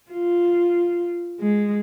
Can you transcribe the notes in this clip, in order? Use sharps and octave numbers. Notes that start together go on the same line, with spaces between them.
F4
G#3